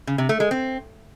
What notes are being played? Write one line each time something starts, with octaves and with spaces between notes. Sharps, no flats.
C#3
C3
A3
G#3
C4